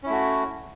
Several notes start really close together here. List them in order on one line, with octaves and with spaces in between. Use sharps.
C#4 E4 A3 F#4